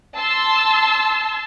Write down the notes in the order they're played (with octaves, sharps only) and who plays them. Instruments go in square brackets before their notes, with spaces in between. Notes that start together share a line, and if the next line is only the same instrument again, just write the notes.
[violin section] A5 C6 E6